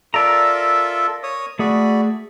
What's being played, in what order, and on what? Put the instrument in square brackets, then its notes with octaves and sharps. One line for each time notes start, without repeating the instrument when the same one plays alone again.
[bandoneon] F4 A4 E5 [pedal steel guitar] A#4 D5 A#5
[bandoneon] C#5 D#6
[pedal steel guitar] A3 G#4 [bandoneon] F#4 D5 B5